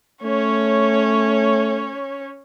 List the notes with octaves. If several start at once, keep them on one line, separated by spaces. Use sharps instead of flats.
A3 C#4 C#5